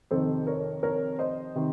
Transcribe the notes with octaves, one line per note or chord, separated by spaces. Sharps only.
F2 C3 D#3 A4 C5
A#4 C#5
A#4 C#5
C5 D#5
C3 D#3